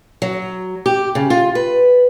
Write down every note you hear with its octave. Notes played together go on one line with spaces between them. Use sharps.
F#3
G4
C#3
F4
B4